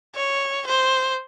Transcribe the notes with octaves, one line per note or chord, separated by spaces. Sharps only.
C#5
C5